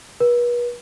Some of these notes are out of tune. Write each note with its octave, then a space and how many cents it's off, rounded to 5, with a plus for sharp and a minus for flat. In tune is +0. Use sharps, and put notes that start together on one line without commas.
B4 -40